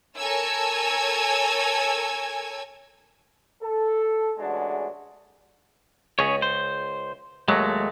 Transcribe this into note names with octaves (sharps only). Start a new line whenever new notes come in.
A4 A#4 C#5 G#5 E6 G#6
A4
A1 E2 G#3 D4 F#4
C#2 C#4 G#4 C#5
C5
D#2 F#3 G#3 A3